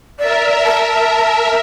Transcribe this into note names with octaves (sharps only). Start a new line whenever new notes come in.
A#4 D5 E5
A5